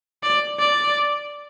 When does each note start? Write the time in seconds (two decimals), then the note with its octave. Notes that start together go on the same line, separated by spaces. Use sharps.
0.23 D5
0.59 D5